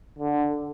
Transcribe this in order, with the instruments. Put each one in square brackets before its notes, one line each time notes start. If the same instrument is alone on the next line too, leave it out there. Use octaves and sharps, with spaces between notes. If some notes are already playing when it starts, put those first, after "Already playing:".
[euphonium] D3